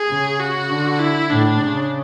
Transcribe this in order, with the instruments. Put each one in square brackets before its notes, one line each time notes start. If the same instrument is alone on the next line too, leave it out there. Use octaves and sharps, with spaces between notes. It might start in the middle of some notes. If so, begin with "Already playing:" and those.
Already playing: [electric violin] G#4
[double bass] C#3
[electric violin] F#4
[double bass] D3
[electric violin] E4
[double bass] A2 [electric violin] D4
[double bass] C#3